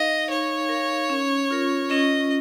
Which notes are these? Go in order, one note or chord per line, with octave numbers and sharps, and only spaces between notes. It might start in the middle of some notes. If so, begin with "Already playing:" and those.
Already playing: D#4 A#4 D#5 F5
D#4 C#5
A#4 F5
C#4
F4 A#4
C#4 D#5